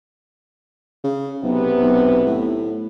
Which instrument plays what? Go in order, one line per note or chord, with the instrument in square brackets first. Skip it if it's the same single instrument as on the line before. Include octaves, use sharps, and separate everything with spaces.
[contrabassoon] C#3
[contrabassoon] B1 [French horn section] C3 B3
[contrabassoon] B1
A2